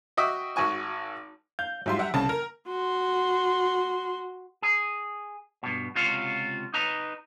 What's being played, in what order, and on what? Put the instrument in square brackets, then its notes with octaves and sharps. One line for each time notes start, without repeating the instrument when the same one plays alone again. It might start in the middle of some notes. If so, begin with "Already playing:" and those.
[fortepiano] F#4 D#5 E5 G5 D6
G#1 F#4 G#5 C#6
[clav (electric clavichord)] F5 [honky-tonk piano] G6
[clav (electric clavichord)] G#2 G3 F4 [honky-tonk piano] F#3 E5 C6
[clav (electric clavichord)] G3 A#5 [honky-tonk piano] E5 F#5
[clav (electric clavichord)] C2 [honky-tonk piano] C#3 A5
[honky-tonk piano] A#4 [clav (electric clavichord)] A#5
[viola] F#4 C6
[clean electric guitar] G#4
G2 B2
C#2 C3 F4 F#4 F5
D#4 B4 A#5